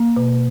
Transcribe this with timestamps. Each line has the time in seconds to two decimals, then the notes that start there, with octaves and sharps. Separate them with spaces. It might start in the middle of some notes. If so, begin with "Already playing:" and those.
Already playing: A#3
0.16 B2